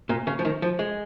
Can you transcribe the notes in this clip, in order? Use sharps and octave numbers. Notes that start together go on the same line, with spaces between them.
A#2
C#3
F3
D#3
F3
G#3